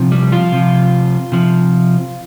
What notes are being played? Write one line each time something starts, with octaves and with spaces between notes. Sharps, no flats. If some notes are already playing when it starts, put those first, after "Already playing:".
Already playing: C3 F3
G3
F3 F4
C3 F3
C3 F3